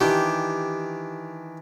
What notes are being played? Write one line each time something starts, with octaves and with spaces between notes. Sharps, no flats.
D#3 E3 D4 G4